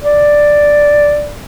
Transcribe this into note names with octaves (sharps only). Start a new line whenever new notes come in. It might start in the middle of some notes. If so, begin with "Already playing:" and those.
D5